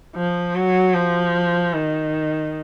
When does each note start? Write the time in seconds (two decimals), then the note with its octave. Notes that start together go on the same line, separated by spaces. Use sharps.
0.16 F3
0.55 F#3
0.95 F3
1.73 D#3